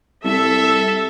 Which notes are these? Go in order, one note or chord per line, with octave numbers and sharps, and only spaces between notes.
C2 A4 E5